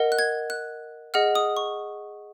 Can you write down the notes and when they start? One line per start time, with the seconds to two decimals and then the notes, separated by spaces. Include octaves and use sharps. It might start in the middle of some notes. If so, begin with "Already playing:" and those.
Already playing: A#4 D#5 F#5
0.12 F#6
0.19 G#6
0.50 F#6
1.14 G#4 D#5 F#5 F6
1.35 D#6
1.57 C#6